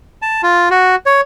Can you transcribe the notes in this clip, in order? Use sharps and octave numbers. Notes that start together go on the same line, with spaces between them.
A5
F4
F#4
C#5